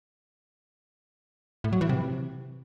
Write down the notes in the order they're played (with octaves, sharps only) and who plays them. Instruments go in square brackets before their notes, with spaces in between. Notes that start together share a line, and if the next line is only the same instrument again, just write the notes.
[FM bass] A2
F#3
E3
C3